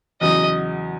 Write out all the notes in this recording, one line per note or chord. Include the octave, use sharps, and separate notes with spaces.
E2 C#3 F#3 D#5